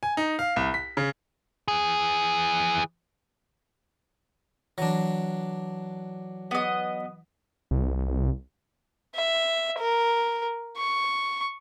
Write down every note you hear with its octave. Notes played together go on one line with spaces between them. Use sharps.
G#5
D#4
F5
C2
B6
C#3
E3 G#4
E3 F#3 D4 A#6
B3 D#5
C2
E5
A#4
C#6